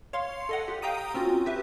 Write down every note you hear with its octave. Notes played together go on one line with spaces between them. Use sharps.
C#5 F5 C6
A4 D#5 F#5
G4
F5 G5 A#5 D#6 D#7
C4 C#4 F4 F#4
G4 B4 E5